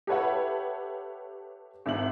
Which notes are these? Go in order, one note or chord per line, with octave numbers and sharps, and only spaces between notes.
G4 A4 B4 C#5 E5 F#5
G#1 E5 F#7